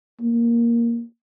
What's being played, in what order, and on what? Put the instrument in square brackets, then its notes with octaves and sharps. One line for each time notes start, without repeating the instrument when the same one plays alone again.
[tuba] A#3